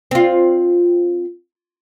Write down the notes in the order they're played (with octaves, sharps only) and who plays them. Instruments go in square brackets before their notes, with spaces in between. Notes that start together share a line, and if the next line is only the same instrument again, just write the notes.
[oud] C4 F4